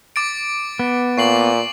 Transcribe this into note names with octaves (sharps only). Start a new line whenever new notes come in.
D6 A6 D7
B3
A#2 C#6 C7 F#7